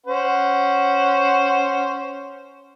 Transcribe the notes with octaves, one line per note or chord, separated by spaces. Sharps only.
C#4 C5 F#5